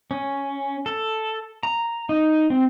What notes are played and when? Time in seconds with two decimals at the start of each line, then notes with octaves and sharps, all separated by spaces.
0.11 C#4
0.86 A4
1.63 A#5
2.09 D#4
2.50 C4